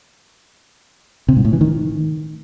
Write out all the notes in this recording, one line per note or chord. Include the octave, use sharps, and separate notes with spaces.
C3
G#2
A2
E3
D#3